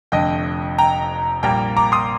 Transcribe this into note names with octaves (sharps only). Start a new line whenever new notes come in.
F1 F2 D3 A3 D#5 G5
G5 A#5
A#1 A#2 G3 A#3 G5 A#5
A#5 D6
C6 D#6